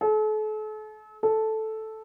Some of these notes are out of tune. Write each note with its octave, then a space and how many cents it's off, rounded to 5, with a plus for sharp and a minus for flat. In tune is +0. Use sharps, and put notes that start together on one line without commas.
A4 -40
A4 -5